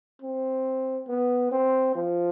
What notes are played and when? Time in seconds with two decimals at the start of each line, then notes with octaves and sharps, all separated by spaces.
0.22 C4
1.08 B3
1.52 C4
1.95 F3